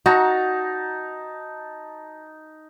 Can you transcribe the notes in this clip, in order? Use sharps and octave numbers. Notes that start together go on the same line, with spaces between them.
D#4 F#4 A5 A#5